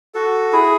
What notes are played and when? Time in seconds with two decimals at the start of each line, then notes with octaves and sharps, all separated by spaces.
0.14 F#4 A4
0.53 E4 G#4